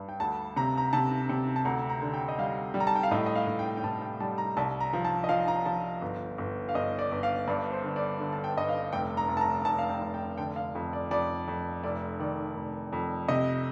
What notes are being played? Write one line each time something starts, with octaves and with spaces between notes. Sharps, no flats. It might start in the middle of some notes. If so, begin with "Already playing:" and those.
Already playing: G2
G5
D2 A5
C3 A#5
A#5
C3 A5
C3
A5
D2 A#5
A#5
D3
G5
D#5
G3 F5
G3
A#5
A5
G5
F5
A2 D#5
D#5
F5
A2
G5
G5
A2 A5
G5
G3 A5
A#5
C2 A5
A#5
F3
A5
D#5
F3 F5
A#5
F3 A5
G1
G1
F5
G1 D#5
D5
G1
F5
G2 D5
C5
D3
D5
D3
A5
G5
G2 D#5
F5
F1 G5
A#5
F1
A5
A#5
F1 A5
F5
G5
F1
G5
D3 G5
F5
F2
D5
F2 D5
F2
F1 D5
D#3 D5
F1
F2
C3 D#5